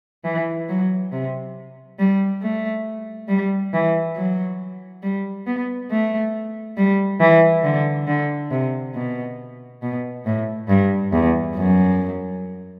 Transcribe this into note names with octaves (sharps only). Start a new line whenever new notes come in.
E3
F#3
C3
G3
A3
G3
E3
F#3
G3
B3
A3
G3
E3
D3
D3
C3
B2
B2
A2
G2
E2
F#2